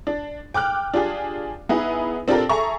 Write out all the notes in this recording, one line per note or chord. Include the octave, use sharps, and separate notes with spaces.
D4
G5 D6 F6 F#6
D4 F4 G4 G#4
B3 D#4 E4 G#4 B4
C4 D4 F4 G4 A4 A#4
G#4 A4 E5 A#5 C#6